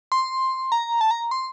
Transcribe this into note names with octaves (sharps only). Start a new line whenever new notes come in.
C6
A#5
A5
A#5
C6